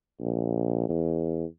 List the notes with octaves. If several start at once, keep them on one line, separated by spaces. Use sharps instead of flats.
A#1
E2